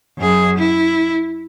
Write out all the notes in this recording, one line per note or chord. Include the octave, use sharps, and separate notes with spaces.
F#2 G#4
E4